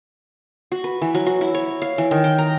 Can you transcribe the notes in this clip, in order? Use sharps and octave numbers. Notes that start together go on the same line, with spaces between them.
F#4
B4
E3
F#3
F#4
E4
C#5
F5
E3
D#3
G5
A#5